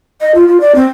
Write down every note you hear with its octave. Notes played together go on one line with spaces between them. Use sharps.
D#5
F4
F4
D5
C4